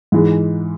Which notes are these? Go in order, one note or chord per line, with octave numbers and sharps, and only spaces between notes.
G#2 E3 G#3